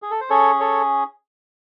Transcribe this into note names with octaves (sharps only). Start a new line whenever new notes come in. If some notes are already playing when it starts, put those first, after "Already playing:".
G#4
A4
C5
C#4 G#4 A4 C#5
A4 C#5